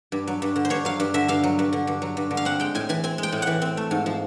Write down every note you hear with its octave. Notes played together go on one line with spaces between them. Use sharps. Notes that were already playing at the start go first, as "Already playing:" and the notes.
G2
F#3
G2
D3
C5
G2 C#5
F#3 F5
G2
D3 E5
G2 F5
F#3
G2
D3
G2
F#3
G2
D3
F5
C4 F#5
G#3 G5
A2 G#5
E3 G#5
C4 G#5
G#3
G5
A2
E3 F#5
C4
A3
G#2
F3